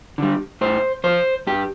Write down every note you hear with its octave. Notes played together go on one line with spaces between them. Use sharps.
D3 G3
A2 C5
F3 C5
G2 G4